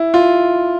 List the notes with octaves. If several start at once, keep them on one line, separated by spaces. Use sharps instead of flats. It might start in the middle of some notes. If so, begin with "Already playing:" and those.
Already playing: E4
F4